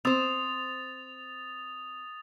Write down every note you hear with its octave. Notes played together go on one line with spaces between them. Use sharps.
C4 C5 D#6 A6 F7